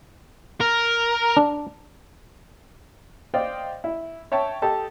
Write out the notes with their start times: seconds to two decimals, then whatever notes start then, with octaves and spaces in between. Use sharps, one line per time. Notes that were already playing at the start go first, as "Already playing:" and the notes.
0.61 A#4
1.37 D4
3.34 C5 D5 D#5 F5 G5
3.84 E4
4.32 C#5 E5 G5 A5 C#6
4.62 G4 A4 D#5 A5